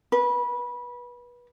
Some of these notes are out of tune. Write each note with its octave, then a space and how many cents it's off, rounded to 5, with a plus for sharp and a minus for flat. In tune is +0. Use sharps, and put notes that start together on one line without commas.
B4 -25